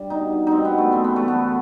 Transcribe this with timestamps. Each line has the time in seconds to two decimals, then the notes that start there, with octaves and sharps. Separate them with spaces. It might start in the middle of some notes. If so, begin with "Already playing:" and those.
Already playing: G2 G3
0.10 B2 D#4
0.31 G3
0.47 B2 C4 D#4
0.65 B3
0.72 G3
0.78 A3
0.92 F#2 C4
1.04 B3
1.13 E3 G3 A3
1.28 B3
1.34 F#2